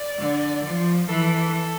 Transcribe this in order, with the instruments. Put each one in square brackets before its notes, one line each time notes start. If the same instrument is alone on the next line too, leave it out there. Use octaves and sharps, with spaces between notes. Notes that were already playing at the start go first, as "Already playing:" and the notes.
Already playing: [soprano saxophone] D5
[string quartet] D3
F3
[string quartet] E3 [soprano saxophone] A4